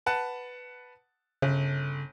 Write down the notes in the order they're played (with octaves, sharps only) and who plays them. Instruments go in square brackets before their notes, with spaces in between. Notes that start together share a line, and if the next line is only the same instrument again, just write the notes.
[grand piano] B4 F#5 A5
[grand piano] G1 [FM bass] C#3